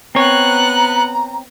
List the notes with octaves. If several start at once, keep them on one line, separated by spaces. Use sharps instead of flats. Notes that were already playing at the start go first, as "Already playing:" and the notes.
B3 C4 C#5 A#5 F#6